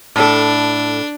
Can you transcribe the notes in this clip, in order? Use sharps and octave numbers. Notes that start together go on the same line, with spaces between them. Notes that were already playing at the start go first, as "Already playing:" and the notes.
A2 D4 A4